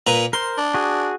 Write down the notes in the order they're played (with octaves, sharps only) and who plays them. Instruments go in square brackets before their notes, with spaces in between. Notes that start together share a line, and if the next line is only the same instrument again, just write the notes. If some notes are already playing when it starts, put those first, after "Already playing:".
[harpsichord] A#2 B4 A#5
[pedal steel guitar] A#4 C5 [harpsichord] C6
[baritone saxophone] D4
[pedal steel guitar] F#4 G#4